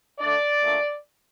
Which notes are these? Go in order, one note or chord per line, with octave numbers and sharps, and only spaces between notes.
D3 A3 D4 D5
A#2 A3 D4